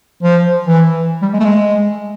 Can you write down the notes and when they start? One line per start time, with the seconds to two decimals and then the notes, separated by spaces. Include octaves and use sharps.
0.23 F3
0.67 E3
1.22 G3
1.33 G#3
1.40 A3
1.44 G#3